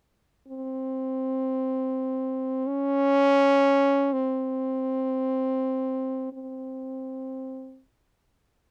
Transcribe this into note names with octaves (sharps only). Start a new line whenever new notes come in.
C4
C#4
C4
C4